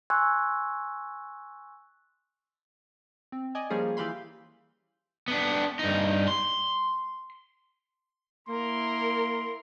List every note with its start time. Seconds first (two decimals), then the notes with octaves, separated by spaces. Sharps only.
0.10 G#5 C6 C#6 E6 F#6 G#6
3.32 C4
3.55 D5 D#5 G#5
3.70 F3 G3 A#3 C#4 G#4
3.97 E3 G4 F5 B5 C6
5.28 B3 D4
5.79 G2 D#4
6.28 C6
8.49 A#3 E4 A#4 A#5 C6